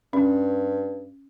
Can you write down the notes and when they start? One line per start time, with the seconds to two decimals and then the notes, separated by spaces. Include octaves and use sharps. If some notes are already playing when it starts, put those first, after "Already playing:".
0.13 G2 C#4